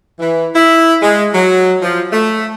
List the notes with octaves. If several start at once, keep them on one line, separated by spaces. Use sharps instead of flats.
E3
E4
G#3
F#3
F3
A3